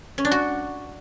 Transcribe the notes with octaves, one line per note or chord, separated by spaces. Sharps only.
C#4
D4
F#4